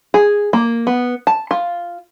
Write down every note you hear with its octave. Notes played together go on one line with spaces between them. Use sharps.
G#4
A#3
B3
A5
F4